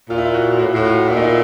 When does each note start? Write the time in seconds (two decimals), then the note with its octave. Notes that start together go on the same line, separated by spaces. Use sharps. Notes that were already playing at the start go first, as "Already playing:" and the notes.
0.09 A#2 F4
0.18 E4
0.25 F4
0.34 F#4
0.59 A2 F#4
0.74 A2 F#4
0.84 F4
1.09 A#2 E4
1.16 D#4
1.23 E4